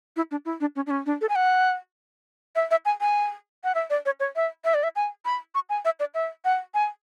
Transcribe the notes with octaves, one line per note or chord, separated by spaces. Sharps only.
E4
D4
E4
D4
C#4
D4
C#4
D4
A4
G#5
F#5
E5
E5
G#5
G#5
F#5
E5
D5
C#5
C#5
E5
E5
D5
E5
G#5
B5
C#6
G#5
E5
D5
E5
F#5
G#5